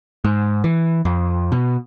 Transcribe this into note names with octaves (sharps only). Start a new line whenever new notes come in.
G#2
E3
F2
B2